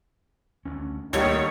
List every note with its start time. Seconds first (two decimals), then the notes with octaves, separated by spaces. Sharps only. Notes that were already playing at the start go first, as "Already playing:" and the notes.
0.66 D2 C#4
1.13 D2 D3 D#3 G3 A#3 C#5